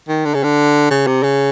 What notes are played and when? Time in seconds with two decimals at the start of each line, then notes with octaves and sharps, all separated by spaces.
0.09 D#3
0.25 D3
0.34 C#3
0.44 D3
0.91 C#3
1.07 C3
1.23 C#3